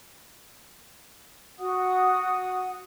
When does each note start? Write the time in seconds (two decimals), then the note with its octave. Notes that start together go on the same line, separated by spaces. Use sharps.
1.59 F#4 F#5 D#6